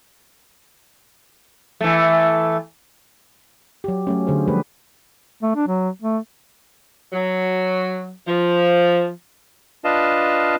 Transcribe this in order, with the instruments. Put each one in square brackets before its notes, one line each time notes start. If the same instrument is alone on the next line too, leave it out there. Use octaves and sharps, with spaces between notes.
[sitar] E3 A3
[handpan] F#3 G4
F#3 A3 C#4
D3 G#4 C5
F3 G3 A3 G4 B4
[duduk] A3
D4
F#3
A3
[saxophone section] F#3
F3
[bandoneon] D4 F4 B4 D#5 F5 A5